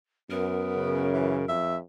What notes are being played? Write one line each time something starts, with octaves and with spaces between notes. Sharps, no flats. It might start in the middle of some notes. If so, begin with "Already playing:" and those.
F#2 B3 A#4
C#3
E3
F2 E5